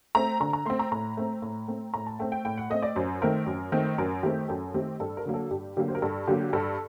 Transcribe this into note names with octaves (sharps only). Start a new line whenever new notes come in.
A3 C4 A#5
D3 A#5
A#5
A3 C4 C6
A#5
A2 A#5
A3 C4
A2
A3 C4
A2 A#5
A5
A3 C4 G5
G5
A2 G5
F#5
A3 C4 D#5
D5
F#2 C5
D#3 A3 C4 A#4
F#2
D#3 A3 C4
F#2 A#4
D#3 A3 C4 G4
F#2 A4
D#3 A3 C4 G4
G2 A4
A#4
D3 F#3 A#3
A4
G2 G4
D3 F#3 A#3 G4
C5
A#4
G2 A4
D3 F#3 A#3 G4
G2 A4